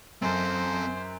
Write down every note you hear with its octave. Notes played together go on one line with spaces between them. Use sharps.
F#2 C4 A4 C5